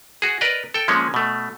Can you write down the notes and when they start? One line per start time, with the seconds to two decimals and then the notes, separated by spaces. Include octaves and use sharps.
0.22 F#4 G#4
0.41 A#4 B4 D5 D#5
0.74 A4 G5
0.88 F3 G#3 A#3 C#4
1.14 B2 A3